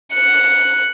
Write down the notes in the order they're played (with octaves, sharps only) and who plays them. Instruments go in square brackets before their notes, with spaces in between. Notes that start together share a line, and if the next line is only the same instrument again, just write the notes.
[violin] F#6 C#7